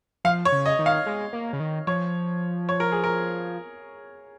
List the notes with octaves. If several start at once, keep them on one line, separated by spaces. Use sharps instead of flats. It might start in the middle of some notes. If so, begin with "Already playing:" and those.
F3 F5
C#5
C#3
D#5
D#3
F5
G#3
A#3
C#3
D#3
F3 C#5
C#5
A#4
G#4
A#4